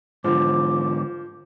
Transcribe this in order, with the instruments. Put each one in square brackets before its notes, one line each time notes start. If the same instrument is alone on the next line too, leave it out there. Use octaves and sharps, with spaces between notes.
[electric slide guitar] G#2 D3 [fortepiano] F3 [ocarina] D6